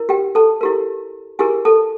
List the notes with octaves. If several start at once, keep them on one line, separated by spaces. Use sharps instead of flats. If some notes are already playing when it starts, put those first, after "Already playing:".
Already playing: E4 A#4
G4 G5
A4 A5
E4 G4 A#4
E4 G4 G#4 A#4 G#5
A4 A5